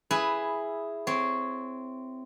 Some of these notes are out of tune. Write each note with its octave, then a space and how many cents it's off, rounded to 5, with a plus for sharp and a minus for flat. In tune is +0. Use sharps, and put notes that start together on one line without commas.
E4 +5 G#4 +0 B4 +0
C4 -15 C#5 +0